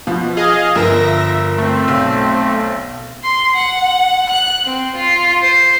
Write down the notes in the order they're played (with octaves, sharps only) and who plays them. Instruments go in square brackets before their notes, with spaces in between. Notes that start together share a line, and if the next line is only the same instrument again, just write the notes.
[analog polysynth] B2 [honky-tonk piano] F3
[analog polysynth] G#4 D#5 F5
[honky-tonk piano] G1 F3 A#4 [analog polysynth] E5 A#6
[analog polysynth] A3 C4
[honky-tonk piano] B1 E6
[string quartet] C6
F#5
F#6
C4
F4
C5